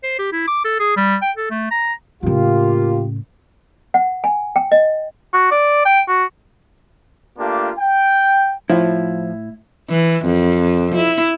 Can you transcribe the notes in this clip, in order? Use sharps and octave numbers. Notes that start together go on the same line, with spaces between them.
C5
G4
E4
D6
A4
G#4
G3
G5
A4
A3
A#5
A2 C#3 A#3 F4 G4
F#5
G#5
G5
D#5
F#4
D5
G5
F#4
A3 A#3 D4 F4 G4
G5
A2 F3 E4
E3
F2
E4